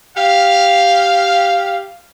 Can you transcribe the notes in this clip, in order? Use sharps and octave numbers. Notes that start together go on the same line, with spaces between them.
G4 F5